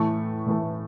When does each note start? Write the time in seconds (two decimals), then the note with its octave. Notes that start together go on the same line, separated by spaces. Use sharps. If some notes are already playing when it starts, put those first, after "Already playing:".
Already playing: A2 E3 A3 C#6
0.47 A2 E3 A3